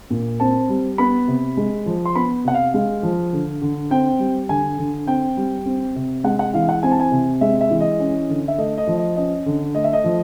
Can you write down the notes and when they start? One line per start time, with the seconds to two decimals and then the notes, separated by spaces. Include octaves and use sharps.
0.10 A#2
0.40 C4 A5
0.69 G3
0.98 B3 B5
1.28 C3
1.57 G#3
1.86 F3
2.05 C6
2.15 B3 B5
2.45 C3 F#5
2.54 F5
2.74 G#3 F5
3.03 F3
3.33 D3
3.62 D3
3.91 C4 G5
4.19 G3
4.49 D3 G#5
4.78 D3
5.07 C4 G5
5.37 G3
5.66 C4
5.96 C3
6.24 G#3 F#5
6.39 F#5
6.54 E3 F5
6.69 F#5
6.83 C4 G#5
6.91 A5
7.00 G#5
7.12 C3
7.41 G#3 E5
7.61 E5
7.70 E3
7.81 D#5
8.00 C#4
8.29 D3
8.48 E5
8.58 A3 D#5
8.78 D#5
8.87 F3
8.97 D#5
9.16 C#4 D#5
9.46 D3
9.74 A3 D#5
9.84 E5
9.93 D#5
10.04 F3